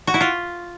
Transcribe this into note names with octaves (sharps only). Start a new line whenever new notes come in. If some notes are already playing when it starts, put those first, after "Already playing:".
F#4
E4
F4